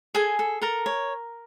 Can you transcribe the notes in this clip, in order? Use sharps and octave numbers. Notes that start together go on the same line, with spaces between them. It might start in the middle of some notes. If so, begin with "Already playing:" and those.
G#4 A4 G#5
A4
A4 A#4 A#5
C#5